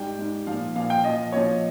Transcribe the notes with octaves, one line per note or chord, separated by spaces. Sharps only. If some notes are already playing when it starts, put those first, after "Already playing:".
Already playing: G#2 G3 G5
G#2 G3
A#2 F3 F5
A#2 F3 F5
G5
A#2 F3 D#5
A#2 F3 C#5